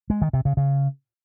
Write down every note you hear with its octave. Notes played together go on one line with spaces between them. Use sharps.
G#3
D#3
C3
C#3
C#3